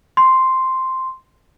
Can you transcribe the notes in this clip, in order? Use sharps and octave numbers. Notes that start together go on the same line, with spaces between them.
C6